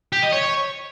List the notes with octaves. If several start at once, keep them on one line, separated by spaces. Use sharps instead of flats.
G4
D#5
C#5